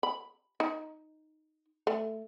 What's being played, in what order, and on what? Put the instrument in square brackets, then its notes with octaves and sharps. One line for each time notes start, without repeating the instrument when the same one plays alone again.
[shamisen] B5
D#4
A3